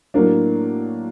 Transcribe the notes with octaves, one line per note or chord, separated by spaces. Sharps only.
A2 F#3 A#3 D4